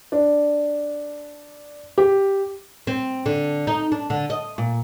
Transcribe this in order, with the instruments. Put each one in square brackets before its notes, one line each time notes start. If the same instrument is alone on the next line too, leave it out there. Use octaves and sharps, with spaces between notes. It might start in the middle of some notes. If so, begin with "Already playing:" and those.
[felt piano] D4
G4
[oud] C4
D3
D#4
D4
D3
D#5
A#2